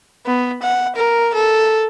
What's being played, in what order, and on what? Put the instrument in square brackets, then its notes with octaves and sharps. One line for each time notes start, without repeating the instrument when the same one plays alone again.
[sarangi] B3
F#5
A#4
A4